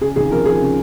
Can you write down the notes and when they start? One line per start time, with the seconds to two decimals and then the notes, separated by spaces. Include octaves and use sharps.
0.01 C#3 G#4
0.16 D#2 G#4
0.31 F3 A#4
0.46 F3 G#4
0.61 C#3